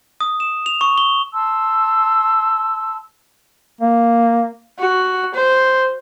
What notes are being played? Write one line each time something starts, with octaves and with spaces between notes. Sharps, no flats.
D#6
E7
F7
C#6
G7
A5 C6 E6
A#3
F#4
C5